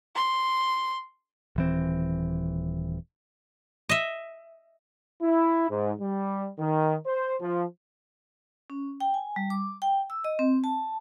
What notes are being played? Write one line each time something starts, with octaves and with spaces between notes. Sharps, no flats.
C6
D#1 E3 C4
D#5 E5
E4
G#2
G3
D#3
C5
F3
C#4
G5
G#5
G3
D6
G5
E6
D#5
C4
A5